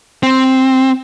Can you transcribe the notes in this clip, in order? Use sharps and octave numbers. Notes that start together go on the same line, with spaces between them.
C4